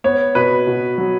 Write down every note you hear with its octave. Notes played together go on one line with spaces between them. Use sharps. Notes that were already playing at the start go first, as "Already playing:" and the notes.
B3 C#5
B2 B4
B2
F#3